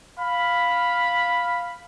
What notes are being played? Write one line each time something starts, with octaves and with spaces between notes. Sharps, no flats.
F5 B5